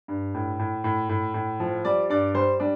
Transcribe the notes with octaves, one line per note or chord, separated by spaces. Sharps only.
G2
A2
A2
A2
A2
A2
F3
G3 D5
G2 D5
G3 C5
G3 D4